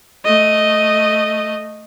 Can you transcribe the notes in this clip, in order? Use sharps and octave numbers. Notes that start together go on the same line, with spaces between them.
A3 D#5